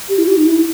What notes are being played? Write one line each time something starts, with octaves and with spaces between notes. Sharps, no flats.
G4
E4
G4
D#4
E4